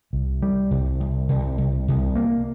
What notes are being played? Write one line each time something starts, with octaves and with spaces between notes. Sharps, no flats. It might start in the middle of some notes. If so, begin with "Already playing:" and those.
C2
G3
C2
C2
C2
C2
C2
A#3